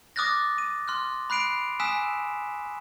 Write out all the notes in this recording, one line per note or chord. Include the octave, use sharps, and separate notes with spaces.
D6 D#6 F6 F#6 A6 A#6
D#7
C6 F6 F#6
B5 F#6 C7 D7 F7
G#5 D#6 E6 F#6 B6 E7